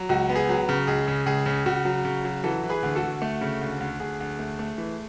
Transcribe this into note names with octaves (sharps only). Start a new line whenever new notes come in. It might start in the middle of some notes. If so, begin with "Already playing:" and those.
Already playing: F#3
C#2 F#4
B3
G#4
F#3
C#3
C#2 G#4
C#3
C#2 G#4
C#3
C#3 F#4
F#3
C#3
F#3
E3 F#4 A4
E3
G#4 B4
D2
F#4 A4
D2
A3
C#3
D2
D2
D2 G#4
D2
A3
A3
E3